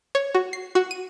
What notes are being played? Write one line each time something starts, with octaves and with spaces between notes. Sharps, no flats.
C#5
F#4
C7
F#4
D#7